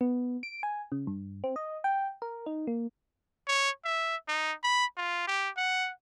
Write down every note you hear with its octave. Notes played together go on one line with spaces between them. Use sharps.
B3
D7
G#5
C#3
G2
C4
D#5
G5
A#4
D#4
A#3
C#5
E5
D#4
B5
F4
G4
F#5